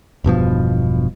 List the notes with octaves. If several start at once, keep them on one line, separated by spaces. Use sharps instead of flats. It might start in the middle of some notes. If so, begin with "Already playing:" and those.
E1 G2 B2 F3